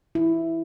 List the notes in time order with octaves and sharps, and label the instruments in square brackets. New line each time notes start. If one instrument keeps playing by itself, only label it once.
[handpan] E4